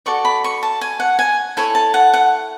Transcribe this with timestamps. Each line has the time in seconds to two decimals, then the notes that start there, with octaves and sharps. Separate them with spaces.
0.06 F#4 A4 D5 C#6
0.25 B5
0.44 C#6
0.63 A5
0.81 G#5
1.00 F#5
1.19 G#5
1.57 E4 A4 C#5 G#5
1.75 A5
1.94 F#5
2.14 F#5